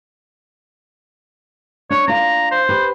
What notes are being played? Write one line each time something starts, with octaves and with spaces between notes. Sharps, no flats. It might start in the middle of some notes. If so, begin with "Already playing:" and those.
D4 C#5
D4 F4 A#5
C5
G4 B4